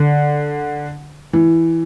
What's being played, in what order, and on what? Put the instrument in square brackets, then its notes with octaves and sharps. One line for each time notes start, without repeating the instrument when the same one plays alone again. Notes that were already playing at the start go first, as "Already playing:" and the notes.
Already playing: [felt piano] D3
E3